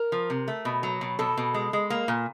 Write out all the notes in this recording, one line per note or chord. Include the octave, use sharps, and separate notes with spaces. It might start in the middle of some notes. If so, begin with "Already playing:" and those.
Already playing: A#4
F3
C3
A3
B2
F#3
B2
B2 A4
B2
G#3
G#3
A#3
A#2